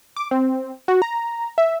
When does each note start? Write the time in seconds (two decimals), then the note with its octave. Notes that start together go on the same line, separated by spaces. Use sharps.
0.16 D6
0.31 C4
0.88 F#4
1.02 A#5
1.58 E5